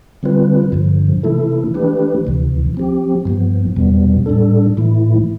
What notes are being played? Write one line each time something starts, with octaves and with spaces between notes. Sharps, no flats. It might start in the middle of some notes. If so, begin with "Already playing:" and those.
D3 G3 C4 F4 B4
G2 D3 F3
C3 E3 A3 E4 A4
E3 A3 D4 G4 B4
D2 C3 E3
F3 C4 G4
G2 F3 B3
E2 B2 G3 B3
A2 G3 D4 A4
A2 E3 A3 E4